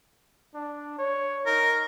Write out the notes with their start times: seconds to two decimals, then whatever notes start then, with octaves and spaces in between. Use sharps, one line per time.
0.55 D4
0.99 C#5
1.46 D#4 A#4